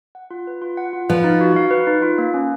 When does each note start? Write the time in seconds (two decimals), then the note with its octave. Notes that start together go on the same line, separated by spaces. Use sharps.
0.15 F#5
0.31 F4
0.47 B4
0.62 F4
0.77 F#5
0.93 F4
1.10 F3 B4
1.24 D#4
1.41 F#4
1.56 F5
1.71 B4
1.87 D#4
2.02 F4
2.18 A#3
2.34 C#4